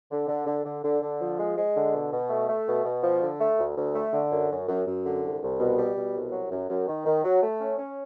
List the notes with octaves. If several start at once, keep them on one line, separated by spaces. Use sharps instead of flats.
D3
D3
D3
D3
D3
D3
F3
G#3
G#3
D3
B2
B2
A3
A3
B2
B2
F3
D3
A3
D2
D2
A3
D3
F#2
F#2
F#2
F#2
D3
C2
C2
B2
G3
B2
C2
F#3
F#2
F#2
D#3
D#3
F#3
A3
C#4
C#4